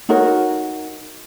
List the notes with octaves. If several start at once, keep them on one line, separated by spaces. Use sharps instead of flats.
D#4 F#4 A#4 C#5